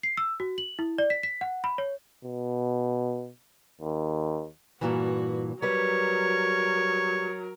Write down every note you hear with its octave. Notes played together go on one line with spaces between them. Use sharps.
C7
E6
F#4
F#7
E4
D5
B6
B6
F#5
B5
C#5
B2
D#2
G2 A#2 E3 F#4
F#3 G3 A#4 B4 C#5